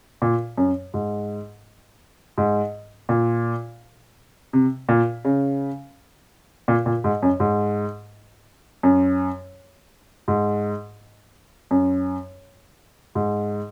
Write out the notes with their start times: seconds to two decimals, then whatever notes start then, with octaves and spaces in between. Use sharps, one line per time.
0.22 A#2
0.58 F#2
0.94 G#2
2.38 G#2
3.09 A#2
4.53 C3
4.89 A#2
5.25 C#3
6.68 A#2
6.86 A#2
7.04 G#2
7.22 F#2
7.40 G#2
8.83 F#2
10.28 G#2
11.71 F#2
13.15 G#2